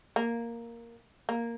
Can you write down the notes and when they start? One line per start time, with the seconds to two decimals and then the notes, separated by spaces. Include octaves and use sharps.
0.16 A#3
1.29 A#3